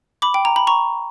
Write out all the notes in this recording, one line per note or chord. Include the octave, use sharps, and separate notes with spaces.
B5 D6
G5
A#5
B5
A#5 C#6